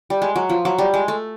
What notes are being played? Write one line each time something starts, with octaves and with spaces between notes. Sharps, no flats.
G3
G#3
F#3
F3
F#3
G3
G#3
A3